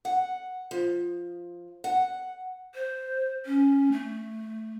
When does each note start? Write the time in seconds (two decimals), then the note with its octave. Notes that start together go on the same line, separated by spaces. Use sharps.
0.05 F#5
0.71 F3
1.84 F#5
2.75 C5
3.46 C#4
3.92 A3